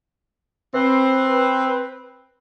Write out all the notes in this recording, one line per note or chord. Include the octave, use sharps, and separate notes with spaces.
C4 B4